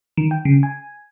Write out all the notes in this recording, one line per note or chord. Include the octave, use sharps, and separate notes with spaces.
D#3
G5
C#3
G#5